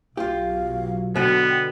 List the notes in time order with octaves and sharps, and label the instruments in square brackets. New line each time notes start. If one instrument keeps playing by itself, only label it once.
[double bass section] B1 F#3 [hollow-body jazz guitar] F4 G4 [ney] F5
[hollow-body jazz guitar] B2 D3 [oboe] B3 [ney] G5